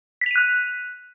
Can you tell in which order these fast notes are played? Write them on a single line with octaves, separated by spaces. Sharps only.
B6 F7 D#7 F#6